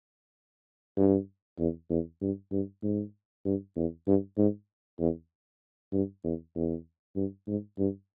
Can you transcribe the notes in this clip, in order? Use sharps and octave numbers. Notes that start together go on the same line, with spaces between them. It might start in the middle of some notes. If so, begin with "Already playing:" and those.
G2
E2
E2
G2
G2
G#2
G2
E2
G2
G#2
E2
G2
E2
E2
G2
G#2
G2